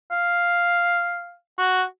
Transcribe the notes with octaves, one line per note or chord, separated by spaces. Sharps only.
F5
F#4